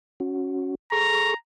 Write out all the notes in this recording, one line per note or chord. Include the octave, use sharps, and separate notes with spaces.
C#4 F#4
G#4 A4 A#5 C#6